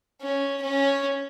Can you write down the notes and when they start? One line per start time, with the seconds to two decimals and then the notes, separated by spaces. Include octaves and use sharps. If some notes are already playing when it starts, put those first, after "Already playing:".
0.21 C#4
0.62 C#4